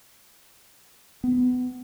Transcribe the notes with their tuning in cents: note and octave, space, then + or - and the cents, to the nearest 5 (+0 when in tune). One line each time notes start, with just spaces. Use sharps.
B3 +20